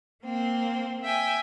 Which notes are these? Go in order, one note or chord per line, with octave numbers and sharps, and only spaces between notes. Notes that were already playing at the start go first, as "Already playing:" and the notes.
A#3 C4
E5 G5 G#5